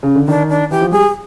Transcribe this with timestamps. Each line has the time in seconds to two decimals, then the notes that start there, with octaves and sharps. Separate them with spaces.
0.03 C#3
0.16 D3
0.28 D#3 D4
0.50 D4
0.71 E3 G4
0.81 F3
0.92 G3 G#4